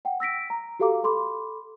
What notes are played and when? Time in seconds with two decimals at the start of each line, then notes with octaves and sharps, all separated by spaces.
0.05 F#5 G5
0.20 E6 A#6 B6 D7
0.50 A#5
0.79 F#4 G4 A4 F5 A#5 D6
1.04 A4 B5 C6 D6